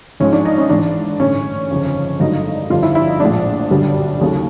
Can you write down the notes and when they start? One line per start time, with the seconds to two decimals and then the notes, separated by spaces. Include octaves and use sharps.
0.20 G#1 G#2 F3 G#3 C#4
0.33 D4
0.45 D#4
0.58 C#4
0.69 G#1 G#2 E3 D4
1.20 A1 G2 D3 C#4
1.70 G1 F2 C#3
2.20 G#1 G2 D3 F#3 A3 D#4
2.70 G1 F2 D3 G3 F4
2.83 E4
2.95 E4
3.08 D#4
3.20 A#1 A2 F3 G#3 D4
3.70 G1 F#2 D3 G3
4.21 D#2 C#3 F#3 A3